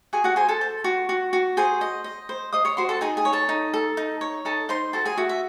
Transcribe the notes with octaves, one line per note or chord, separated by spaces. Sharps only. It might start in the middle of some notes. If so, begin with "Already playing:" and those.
F#4 G#4 G#5
F#4 F#5
G#4 C5 G#5
A4 A5
C5
F#4
F#4
F#4
G#4 C5 G#5
D#5
D#5
C5
C5 D#5 D#6
C#5 C#6
F#4 C5 C6
A4 A5
D#4 G#4 G#5
G#4 G#5
C#5
A4 A5
D#4
A4
D#4
C#5
D#4 A4 A5
D#4 C5 C6
F#4 A4 A5
G#4 G#5
F#4 E5
E5